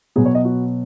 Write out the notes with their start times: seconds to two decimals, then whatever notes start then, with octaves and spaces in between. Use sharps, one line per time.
0.16 B2 F#3 B3 G#4
0.26 C#5
0.35 D#5
0.45 F#4